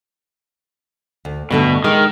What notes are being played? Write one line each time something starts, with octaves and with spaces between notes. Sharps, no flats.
D2
G2 B2 D3 A3
D#3 G#3